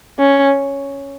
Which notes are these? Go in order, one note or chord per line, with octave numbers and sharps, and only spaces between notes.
C#4